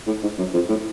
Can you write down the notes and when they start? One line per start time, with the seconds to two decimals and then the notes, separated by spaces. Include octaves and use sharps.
0.07 A2
0.23 G#2
0.39 F#2
0.54 F2
0.69 A2